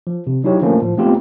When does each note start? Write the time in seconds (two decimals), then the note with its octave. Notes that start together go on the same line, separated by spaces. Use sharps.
0.07 F3
0.27 C3
0.44 F#3 D#4 E4 G4 C#5
0.61 D3 F3 A3 A#3 C#4
0.81 A2 F3
0.97 G#3 A3 B3 C4 F4 G4